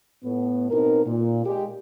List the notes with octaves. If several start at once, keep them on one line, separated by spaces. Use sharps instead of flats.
A2 B3
B2 C4 D#4 A#4
A#2
G#3 G4